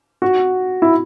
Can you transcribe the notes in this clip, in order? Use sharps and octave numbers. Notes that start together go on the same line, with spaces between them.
F#4
E4